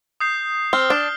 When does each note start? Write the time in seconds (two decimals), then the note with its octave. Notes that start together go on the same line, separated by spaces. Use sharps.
0.20 D#6 G6 C7
0.73 C4 F6 C7 G7
0.90 D4